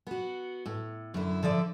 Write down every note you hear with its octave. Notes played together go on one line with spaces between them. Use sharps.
B3 F#4
A2
F#2 D3 E4
D3 F3 D5 E5